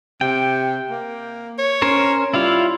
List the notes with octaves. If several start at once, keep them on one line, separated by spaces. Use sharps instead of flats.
C3 G5
A#3
C#5
C#4 A#4 C5
G3 E4 F4 F5